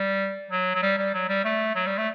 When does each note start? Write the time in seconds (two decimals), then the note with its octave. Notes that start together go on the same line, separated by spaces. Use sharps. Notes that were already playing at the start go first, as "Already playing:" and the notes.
Already playing: G3
0.50 F#3
0.75 F#3
0.82 G3
0.98 G3
1.14 F#3
1.29 G3
1.44 A3
1.75 F#3
1.86 G3
1.98 A3